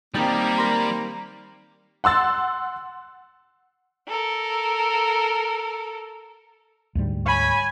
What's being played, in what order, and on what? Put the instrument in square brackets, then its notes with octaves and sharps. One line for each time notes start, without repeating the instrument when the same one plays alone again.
[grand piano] D#3 C4 [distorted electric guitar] G3 [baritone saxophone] A#3 [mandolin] D#4 G5 A5
[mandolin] A#4 C6
[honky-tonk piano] F#5 C6 E6 A6
[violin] A4 A#4
[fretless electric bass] D2 G#2 G3
[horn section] C#5 B5 [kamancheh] G#5